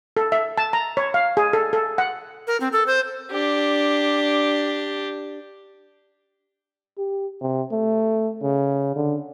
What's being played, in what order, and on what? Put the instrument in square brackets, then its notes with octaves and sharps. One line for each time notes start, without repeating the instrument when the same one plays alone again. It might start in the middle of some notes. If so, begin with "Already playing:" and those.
[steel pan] A4
E5
A5
A#5
C#5
F5
G#4
A4
A4
F#5
[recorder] A#4
C4
A4
C5
[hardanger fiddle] D4 G4
[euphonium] G4
C3
A3
C#3
D3